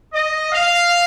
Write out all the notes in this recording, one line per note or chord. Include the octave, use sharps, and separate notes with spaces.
D#5
F5